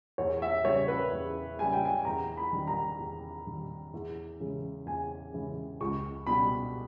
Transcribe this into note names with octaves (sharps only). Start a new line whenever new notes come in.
E2 C#5
E5
C#3 G3 C#5
B4
E2
C#3 G3 G#5
G5
G#5
E2 A#5
B5
D#3 G3
A#5
E2
D#3 G3
E2
C#3 E3 G#3
E2 G#5
C#3 E3 G#3
C#2 C#6
B2 G3 B5